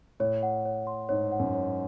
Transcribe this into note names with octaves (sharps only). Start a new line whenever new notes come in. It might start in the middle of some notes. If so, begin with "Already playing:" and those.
A2 C#5
F#5
C#5
C6
G#2 C#5
F#5
F#2
C#5